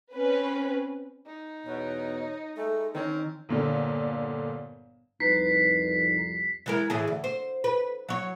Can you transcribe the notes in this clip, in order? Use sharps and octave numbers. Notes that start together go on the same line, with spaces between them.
C4 C#4 B4
D#4
E2 B2 C#5
G#3 A3 A4
D#3 C4 C#4 A#4 D#5
G1 A#2 D3
C2 F2 D#4 B4 B6 C7
E3 G#3 A#4
A2 E3 G#4
D2
C5
B4
F#3 C#5